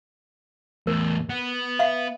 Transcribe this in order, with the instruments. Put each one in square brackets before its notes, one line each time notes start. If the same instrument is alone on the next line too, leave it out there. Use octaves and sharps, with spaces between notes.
[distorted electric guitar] E2 A2 [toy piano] A#4
[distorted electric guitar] B3
[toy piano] E5 F5